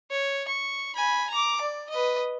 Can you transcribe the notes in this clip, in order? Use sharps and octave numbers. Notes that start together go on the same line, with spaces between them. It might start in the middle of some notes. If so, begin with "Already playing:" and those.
C#5
C#6
G#5 B5
A#5 D6
D5
B4 D#5